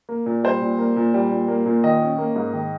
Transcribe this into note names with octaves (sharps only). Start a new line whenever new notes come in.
A#3
A#2
G3 C5
A#2
A#3
A#2
G3
A#2
A#3
A#2
D#3 D#5
C#4
A#3
G#2
D#3